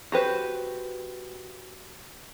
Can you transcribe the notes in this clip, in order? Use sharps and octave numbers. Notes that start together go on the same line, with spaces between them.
F#4 G4 B4 C5